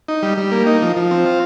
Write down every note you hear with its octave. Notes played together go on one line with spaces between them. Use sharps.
D#4
G3
G3
A#3
D#4
F3
F3
C4
F4